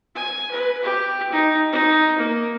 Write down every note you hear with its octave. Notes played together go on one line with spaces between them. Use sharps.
G#5
B4
G4
D#4
D#4
A#3